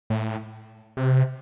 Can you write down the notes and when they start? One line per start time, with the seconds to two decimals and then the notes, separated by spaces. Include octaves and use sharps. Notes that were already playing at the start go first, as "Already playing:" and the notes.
0.10 A2
0.97 C3